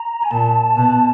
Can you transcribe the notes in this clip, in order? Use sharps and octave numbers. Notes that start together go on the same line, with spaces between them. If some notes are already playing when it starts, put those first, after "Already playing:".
Already playing: A#5
G#5
A#2 A5
B2